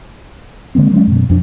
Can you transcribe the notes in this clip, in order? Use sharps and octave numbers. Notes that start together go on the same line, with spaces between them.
D3 G#3 A#3 C4
F#3 G#3 C#4
F#2 B2
F2 D4